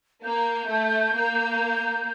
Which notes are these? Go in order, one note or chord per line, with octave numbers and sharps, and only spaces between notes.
A#3 G6
A3
A#3